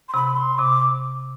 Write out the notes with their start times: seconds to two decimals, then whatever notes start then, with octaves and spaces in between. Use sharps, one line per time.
0.09 C6
0.14 C3 B5
0.36 C6
0.58 C3 D6